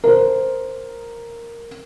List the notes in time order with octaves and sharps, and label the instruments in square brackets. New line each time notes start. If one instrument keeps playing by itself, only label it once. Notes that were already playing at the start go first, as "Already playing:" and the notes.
[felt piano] A#4 C5